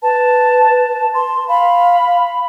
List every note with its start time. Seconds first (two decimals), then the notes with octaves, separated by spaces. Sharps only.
0.03 B4 A5
1.14 C6
1.48 F5 B5